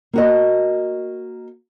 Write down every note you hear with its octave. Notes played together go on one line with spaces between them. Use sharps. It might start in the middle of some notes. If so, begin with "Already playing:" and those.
A#3 F#4 D#5